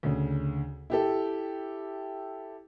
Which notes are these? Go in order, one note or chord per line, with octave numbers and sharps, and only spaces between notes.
D2 C#3
E4 G4 A4